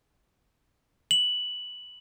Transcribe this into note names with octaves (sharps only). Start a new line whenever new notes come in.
F#7